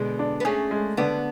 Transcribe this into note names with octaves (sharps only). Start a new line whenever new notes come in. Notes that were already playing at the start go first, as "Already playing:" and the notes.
Already playing: B2 D3 G#3
D4
B3
A3 C#4 G#4
G#3
D3 B3 D4